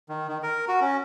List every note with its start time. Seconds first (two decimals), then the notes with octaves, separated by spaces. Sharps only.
0.09 D#3
0.28 D#3
0.43 A#4
0.68 F#4
0.82 C#4